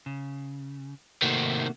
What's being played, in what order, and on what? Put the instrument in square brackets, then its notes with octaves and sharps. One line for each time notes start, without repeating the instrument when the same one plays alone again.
[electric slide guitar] C#3
[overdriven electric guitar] C3 D#3 [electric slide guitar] A3 A#3 F#4